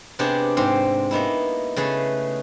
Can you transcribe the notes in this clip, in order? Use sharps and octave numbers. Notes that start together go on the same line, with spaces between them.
C3 B3 D4 G4 G#4
G#2 C4 G4 F5
A#3 B3 D#4 E4
C#3 A3 G#4 B4